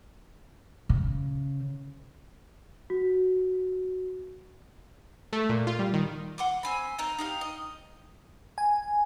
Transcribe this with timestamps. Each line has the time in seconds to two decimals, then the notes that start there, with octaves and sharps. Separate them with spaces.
0.89 C#3
2.90 F#4
5.33 A3
5.49 A#2
5.67 F4
5.79 G3
5.94 D#3
6.38 F#5 C6 D6
6.63 C4 G#5 B5
6.98 C4 D#4 A#4
7.18 D#4 G4 F5
7.41 D#5
8.58 G#5